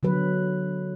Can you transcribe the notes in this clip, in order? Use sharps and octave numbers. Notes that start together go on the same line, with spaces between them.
D3 F#3 B4